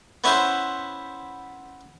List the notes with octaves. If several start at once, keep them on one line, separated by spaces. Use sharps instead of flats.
B3 C#4 E4 B4 C5